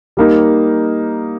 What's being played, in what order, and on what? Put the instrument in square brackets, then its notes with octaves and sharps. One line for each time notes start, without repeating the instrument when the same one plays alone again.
[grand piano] G3 A#3 D#4